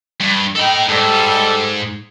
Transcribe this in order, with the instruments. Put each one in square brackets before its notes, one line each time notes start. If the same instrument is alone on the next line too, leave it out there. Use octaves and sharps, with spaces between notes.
[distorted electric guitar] G2
[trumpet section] D#4 G5 [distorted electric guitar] A4 B5
[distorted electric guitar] G#2 [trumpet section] G3 A4